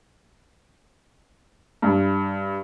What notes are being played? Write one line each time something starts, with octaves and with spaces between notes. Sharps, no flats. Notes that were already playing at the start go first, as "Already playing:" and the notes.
G2